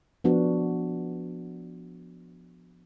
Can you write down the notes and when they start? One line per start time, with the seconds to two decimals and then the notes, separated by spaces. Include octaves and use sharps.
0.24 F3 B3 D4 F#4